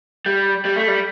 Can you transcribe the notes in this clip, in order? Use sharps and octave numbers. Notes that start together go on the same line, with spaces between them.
G3
G3
A3
G3